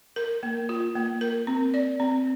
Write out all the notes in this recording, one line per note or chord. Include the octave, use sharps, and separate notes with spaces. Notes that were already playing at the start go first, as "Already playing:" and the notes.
A#4
A#3
F4
A#3
A#4
C4
D5
C4